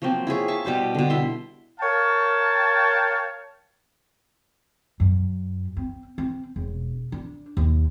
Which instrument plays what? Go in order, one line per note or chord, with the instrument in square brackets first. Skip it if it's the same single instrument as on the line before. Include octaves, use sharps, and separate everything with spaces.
[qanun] F3 F#3 A#3 C4
E4 F4 G#4 C#5
E5 A5 C#6
B2 G3 C5 D6
B2 D3
E4 E5 C6
[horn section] A#4 C#5 F5 G5 A5
[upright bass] F#2
C4
C4
E1
D4
D#2